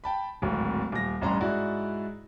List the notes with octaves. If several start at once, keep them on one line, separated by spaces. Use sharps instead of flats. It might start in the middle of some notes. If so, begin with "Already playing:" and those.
G5 A5 B5
D1 G#1
D#1 A#6
A1 G2 C#4 A#5 C6
G#2 E4 F#4 D5